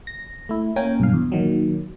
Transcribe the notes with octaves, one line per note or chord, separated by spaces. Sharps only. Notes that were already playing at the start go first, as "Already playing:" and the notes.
A#6
A3 E4
A#3 C#4 A#4 G5 G#5
B1 G2 F5
E2
A#2 D#3 F#3